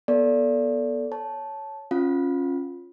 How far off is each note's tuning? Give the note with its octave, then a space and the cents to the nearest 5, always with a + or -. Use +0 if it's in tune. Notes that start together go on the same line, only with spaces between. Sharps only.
B3 -20 A4 +0 D5 -25
C#5 +0 A5 -10
C#4 -20 F4 +10 F5 +30